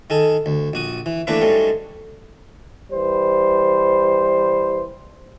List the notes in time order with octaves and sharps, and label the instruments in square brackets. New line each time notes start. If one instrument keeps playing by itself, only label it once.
[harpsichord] D#3 G#4 A4
D2
A#1 F#4 D#6
E3
E3 A3 A#3 D4 B4 E5
G#2 F#3 G3 A3 C#4
[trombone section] E3 G3 B4 C5